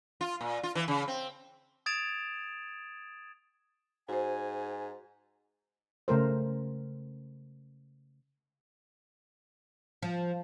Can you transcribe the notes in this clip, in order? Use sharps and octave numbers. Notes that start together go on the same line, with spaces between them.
F4
A#2
F4
E3
C#3
C4
D#6 G#6 A6 D7 E7 F7
G#2 F#4 C5 G#5
C#3 A3 A#4 C5
F3